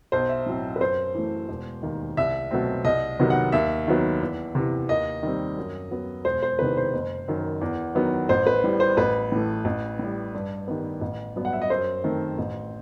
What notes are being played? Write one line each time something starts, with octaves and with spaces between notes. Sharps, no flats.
B1 C5
E5
A2 F#3 C4
B4
F#2 C5
E3 A3
E1
D#2 D#3
C2 E5
B2 F#3 A3 C4
C2 D#5
C3 D#3 F#3 B3
F#5
D#2 E5
D#3 F#3 B3
E2
C3 E3
D#2 D#5
D#3 G3 C4
F#2
F#3 B3
E1 C5
C5
E2 C3 D#3 B4
C5
F#1
F#2 D#3
E2
D#3 F#3 B3
A1 C5
B4
A2 G3
C5
A1 B4
A2 E3 A3
A1
A2 G3
G2
D#3 G3 B3
A1
G2 F#3 B3
F#5
E5
D#5
F#2 C5
D#3 A3 C4
A1